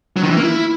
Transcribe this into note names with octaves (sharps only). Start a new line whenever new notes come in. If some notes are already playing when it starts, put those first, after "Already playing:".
F#3
D#3
E3
A#3
E4